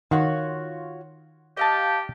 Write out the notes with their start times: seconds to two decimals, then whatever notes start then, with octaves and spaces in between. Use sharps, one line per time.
0.11 D#3 F4 F#4 C#5 F#5
1.57 G4 D#5 F5 A5